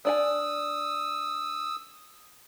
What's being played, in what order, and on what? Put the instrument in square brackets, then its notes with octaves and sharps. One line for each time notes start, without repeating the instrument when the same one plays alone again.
[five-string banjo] D4 D5 G#5 [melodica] D#6 E6